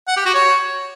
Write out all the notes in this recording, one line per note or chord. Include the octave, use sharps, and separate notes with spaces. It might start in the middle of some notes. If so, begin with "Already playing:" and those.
F#5
G4
F#4
C#5